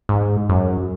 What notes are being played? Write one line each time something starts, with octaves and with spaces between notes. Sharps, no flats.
G#2
F#2